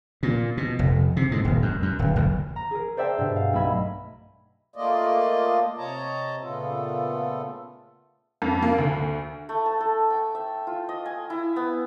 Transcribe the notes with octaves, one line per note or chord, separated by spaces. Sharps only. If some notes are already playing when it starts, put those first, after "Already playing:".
A#2
B2
F1
C3
G#2
D#1
F#2
F#2
D1
F1
A#5
G#4 A#4
C5 D5 E5 G5 A5
G2 B2
F5
B1 A3 D#5 E5 B5 G#6
A3 A#3 F4 D5 D#5
C3 C#5 D#5 A5 A#5
A#2 C#3 A3 B3 F4 A4
F2
A#3
D2
A3
A5
A4
G5
E5
F4
D#5
G#5
E4
B3